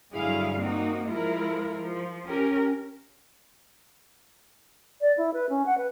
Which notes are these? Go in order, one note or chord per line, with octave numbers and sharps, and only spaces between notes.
G2 D3 F#3 E4 G#4 F5
A#3 C4 D#4 F#4
F3 G#3 E4 F4 A#4
F3
C#4 G4 A#4
D5
E4
B4
C#4
F#5
B4